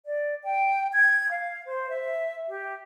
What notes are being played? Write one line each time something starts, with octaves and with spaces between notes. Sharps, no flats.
D5
G5
G#6
F5
C5
E5
G4